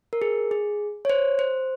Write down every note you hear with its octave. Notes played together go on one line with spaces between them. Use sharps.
A#4
G#4
G#4
C#5
C5
C5